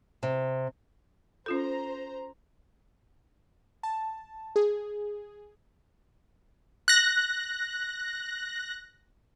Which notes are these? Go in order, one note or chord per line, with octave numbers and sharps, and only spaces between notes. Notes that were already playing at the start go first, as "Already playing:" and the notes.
C3
C#4 F4 A4 C5 A#5
A5
G#4
F#6 A#6